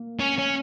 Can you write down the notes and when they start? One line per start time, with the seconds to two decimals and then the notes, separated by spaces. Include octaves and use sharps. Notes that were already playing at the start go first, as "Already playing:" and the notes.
Already playing: A#3
0.20 C#4
0.38 C#4